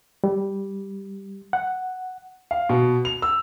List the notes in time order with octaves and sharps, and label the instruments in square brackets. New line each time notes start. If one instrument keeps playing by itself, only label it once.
[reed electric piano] G3
F#5
[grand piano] F5
B2
F7
E6